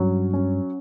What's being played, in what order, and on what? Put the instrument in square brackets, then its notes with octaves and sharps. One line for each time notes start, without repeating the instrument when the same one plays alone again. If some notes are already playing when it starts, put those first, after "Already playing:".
Already playing: [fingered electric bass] G2 [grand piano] F#3 C#4
[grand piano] C#4